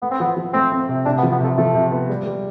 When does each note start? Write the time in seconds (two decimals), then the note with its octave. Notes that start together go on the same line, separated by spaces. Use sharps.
0.02 A3 B3
0.11 C4
0.20 F3 B3
0.37 F3
0.53 A3 C4
0.72 C4
0.89 C3
1.06 C3 D4
1.18 B3
1.23 F3
1.32 B3
1.40 C3 A3
1.58 F3 A3
1.75 C3
1.92 B3
2.10 G3
2.26 G3